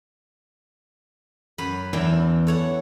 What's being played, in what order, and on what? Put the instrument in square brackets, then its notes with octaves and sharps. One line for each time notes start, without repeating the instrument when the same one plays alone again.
[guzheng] F#2 B4 B5
[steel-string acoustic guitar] E2 [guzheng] E3 D4 G5
[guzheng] A4 C#5 F#5